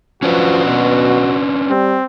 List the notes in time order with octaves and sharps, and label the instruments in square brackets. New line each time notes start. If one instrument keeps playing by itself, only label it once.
[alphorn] F3 [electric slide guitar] C#4 D4 B4 [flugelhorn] F#4
[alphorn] B2
[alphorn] G3 [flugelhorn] C4